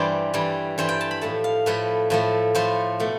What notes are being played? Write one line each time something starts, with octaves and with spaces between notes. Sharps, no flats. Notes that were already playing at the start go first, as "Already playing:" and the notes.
Already playing: G2 E3 G3 C5 D5
G2 E3 G3
G2 E3 G3 C5
G5
A5
B5
A2 F3 A3 A5
F5
A2 F3 A3 B4
A2 F3 A3
A2 F3 A3 C5
B2 A3